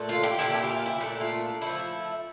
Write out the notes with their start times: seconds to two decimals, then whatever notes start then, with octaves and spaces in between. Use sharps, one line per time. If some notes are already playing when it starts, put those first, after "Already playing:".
Already playing: A#2 A3 D4
0.09 F4
0.23 E4 G4
0.39 A#2 A3 D4 E4 G4
0.54 E4 G4
0.70 F4
0.86 E4
1.00 A#2 A3 D4 E4
1.21 F4
1.62 F3 A3 E4